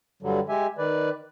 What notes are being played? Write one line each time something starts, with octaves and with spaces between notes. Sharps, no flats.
G2 D3 F#3 G3
G#3 G4 E5 G#5
D#3 B4 D5